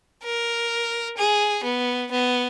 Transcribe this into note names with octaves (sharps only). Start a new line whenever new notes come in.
A#4
G#4
B3
B3